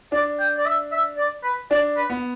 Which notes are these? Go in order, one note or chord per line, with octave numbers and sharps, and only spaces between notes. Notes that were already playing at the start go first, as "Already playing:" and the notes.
D4 D5
G5
D5
E5
E5
D5
B4
D4 D5
B4
B3